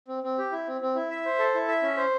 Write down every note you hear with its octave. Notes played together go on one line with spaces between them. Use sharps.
C4
C4
G4
E4
C4
C4
E4
E5
C5
A4
E4
E5
C#4
C5